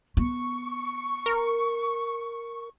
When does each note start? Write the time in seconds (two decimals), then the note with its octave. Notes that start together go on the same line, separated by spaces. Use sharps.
0.17 B3 C#6
1.26 A#4